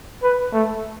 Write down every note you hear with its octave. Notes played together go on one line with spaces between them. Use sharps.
B4
A3